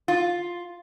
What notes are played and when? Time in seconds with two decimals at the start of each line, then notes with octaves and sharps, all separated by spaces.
0.08 F4